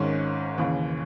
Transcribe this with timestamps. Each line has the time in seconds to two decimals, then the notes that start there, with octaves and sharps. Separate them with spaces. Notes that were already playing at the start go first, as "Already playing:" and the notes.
Already playing: G#1 G#2 D#3 C#4
0.58 D#2 C#3 E3